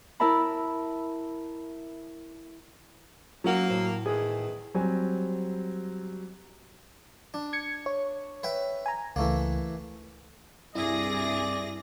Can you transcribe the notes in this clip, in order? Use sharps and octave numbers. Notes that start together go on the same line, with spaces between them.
E4 A#4 E5 A5 B5
F#3 A#3 C#4 A#4 F#5
A2 C5
E2 D#3 E3 G#4
F#3 G3 C4 C5 G#5
D4
G#6 C#7
C#5
B4 E5 G5
G#5 A#5
C#2 E3 A3 A#3
C2 G2 E4 G#4 D5 E5 A#6